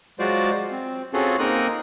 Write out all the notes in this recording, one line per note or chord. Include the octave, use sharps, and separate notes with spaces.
F#3 G#3 F4 F#4 C5 D5
C4
C4 C#4 F4 F#4 G#4 A4
A#3 C4 D#4 A#4 D#6 F#6